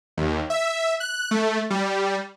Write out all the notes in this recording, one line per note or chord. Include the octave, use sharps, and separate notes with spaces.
D#2
E5
F#6
A3
G3